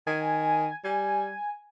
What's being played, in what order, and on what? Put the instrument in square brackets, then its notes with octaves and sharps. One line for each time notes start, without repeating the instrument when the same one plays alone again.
[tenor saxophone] D#3 [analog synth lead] G#5
[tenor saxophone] G3 [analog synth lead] G#5